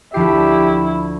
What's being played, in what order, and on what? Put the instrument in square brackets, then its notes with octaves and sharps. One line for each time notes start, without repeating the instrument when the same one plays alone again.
[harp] D2 F3 C7 [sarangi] E4 [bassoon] G4